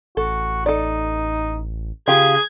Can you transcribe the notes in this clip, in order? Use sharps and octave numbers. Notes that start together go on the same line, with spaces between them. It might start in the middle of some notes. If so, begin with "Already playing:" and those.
A1 F#4 A4
D#4 A4 D5
C#3 F4 G4 G#4 F5 G#6